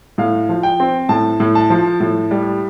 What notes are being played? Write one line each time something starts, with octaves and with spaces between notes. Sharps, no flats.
A2 F5
F3
G5
C4
A2 A5
A2
A5
F3
A2
G3